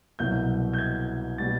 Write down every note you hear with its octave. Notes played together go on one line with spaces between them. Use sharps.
C2 B2 F#3 G6
G6
G#6
B2 G3 A6